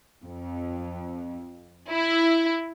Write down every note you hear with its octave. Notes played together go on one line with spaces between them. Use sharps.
F2
E4